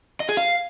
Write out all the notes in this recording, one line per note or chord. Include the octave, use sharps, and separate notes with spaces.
D#5
G#4
F5